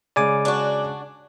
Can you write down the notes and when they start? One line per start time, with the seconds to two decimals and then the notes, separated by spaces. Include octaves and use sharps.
0.16 C#3 G#3 D5 G#5 D6
0.45 D4 F#4